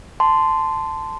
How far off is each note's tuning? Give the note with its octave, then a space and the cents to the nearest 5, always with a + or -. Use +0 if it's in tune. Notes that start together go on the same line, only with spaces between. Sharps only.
A5 +0 C6 -15